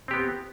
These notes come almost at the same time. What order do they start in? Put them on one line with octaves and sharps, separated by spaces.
C4 G4 B3